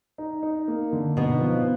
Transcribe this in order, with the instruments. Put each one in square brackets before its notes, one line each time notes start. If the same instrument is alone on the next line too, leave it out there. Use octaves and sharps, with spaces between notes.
[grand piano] D#4
D#4
A#3
D3
[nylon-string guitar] B2 B3 [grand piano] D#4
[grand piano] F3